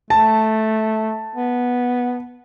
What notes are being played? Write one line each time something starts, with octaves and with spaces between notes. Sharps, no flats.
A3 A5
B3